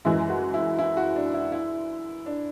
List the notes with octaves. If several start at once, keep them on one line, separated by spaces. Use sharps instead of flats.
F#2 E3 G#3 E4
F#4
E4
E4
F#4
D4
E4
E4
D4